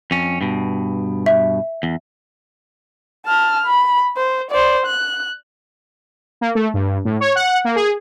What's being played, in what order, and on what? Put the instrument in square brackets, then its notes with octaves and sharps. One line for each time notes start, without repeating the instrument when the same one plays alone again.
[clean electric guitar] F2 C#4
G2 B2
[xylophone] E5
[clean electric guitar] E2
[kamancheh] A5 F6
B5
C5
C5 D5
F#6
[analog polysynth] A#3
A3
G2
A2
C#5
F#5
A#3
G#4